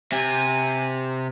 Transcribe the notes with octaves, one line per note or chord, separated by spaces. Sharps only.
C3 G#5